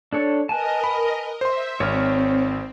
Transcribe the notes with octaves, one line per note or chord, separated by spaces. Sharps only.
D4 A4 C#5
A#4 B4 D#5 G#5 A5
B5
C5 E5 C6
G#1 C4 C#5 F6